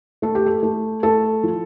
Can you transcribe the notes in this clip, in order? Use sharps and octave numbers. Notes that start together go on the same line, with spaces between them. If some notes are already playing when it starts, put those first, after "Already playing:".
A3 A4
G4
A4
A3
A3 A4
F3